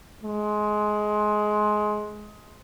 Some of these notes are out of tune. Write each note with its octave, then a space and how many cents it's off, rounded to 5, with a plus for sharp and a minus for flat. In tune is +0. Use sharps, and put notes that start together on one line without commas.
G#3 +20